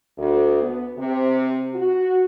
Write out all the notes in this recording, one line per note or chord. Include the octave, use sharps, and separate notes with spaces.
D2
B3
C3
F#4